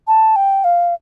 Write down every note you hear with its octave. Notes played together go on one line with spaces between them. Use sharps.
A5
G5
F5